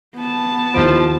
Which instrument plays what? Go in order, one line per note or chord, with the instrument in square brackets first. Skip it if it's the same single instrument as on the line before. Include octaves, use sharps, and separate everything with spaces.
[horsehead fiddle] B3 A5
[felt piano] D#2 E4 D7 [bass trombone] F3